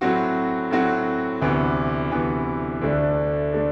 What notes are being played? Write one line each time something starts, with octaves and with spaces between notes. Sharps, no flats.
A2 F#3 C4 F#4
A2 F#3 C4 F#4
D2 C3 E3 B3
D2 C3 E3 B3
D2 D3 A3 D4
D3 A3 D4